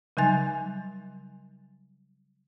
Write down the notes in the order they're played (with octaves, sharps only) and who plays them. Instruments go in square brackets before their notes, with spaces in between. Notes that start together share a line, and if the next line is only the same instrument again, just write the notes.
[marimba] C#3 F#3 G3 D#4 G#5 A6